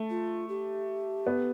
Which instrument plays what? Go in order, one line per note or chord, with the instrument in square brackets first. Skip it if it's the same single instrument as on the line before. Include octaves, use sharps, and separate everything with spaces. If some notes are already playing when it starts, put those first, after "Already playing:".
Already playing: [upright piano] A3
[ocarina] F4
G4
[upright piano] B3